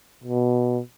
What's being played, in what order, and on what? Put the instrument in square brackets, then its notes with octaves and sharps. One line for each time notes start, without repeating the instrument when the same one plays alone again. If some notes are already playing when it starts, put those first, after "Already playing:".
[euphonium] B2